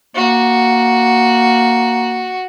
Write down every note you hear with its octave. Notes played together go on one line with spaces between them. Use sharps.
A#3 F#4